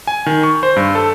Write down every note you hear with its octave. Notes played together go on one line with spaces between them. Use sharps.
G#5
D#3
C#6
C5
G2
A4